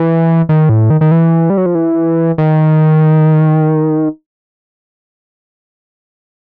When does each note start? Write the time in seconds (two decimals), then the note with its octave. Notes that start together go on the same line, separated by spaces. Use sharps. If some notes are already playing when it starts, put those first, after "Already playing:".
Already playing: E3
0.49 D#3
0.69 A2
0.90 D#3
1.01 D#3
1.11 E3
1.50 G3
1.57 F#3
1.66 F3
1.75 E3
2.38 D#3